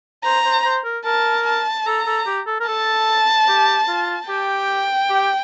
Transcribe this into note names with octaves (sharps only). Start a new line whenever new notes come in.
C5 A#5
C5
C5
A#4
A#4 A5
A5
A4 A#5
A4
G4
A4
A#4
A4 A5
G4
F4
G4 G5
G4